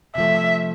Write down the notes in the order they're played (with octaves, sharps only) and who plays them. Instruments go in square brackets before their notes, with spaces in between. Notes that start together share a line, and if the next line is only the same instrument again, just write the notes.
[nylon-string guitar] C3 F3 A3 [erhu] E5